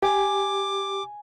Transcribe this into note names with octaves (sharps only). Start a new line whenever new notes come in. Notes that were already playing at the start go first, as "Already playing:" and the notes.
G4 G#5 D6